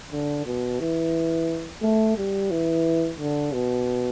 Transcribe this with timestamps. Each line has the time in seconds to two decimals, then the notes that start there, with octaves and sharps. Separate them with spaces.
0.12 D3
0.46 B2
0.80 E3
1.82 A3
2.17 G3
2.51 E3
3.19 D3
3.53 B2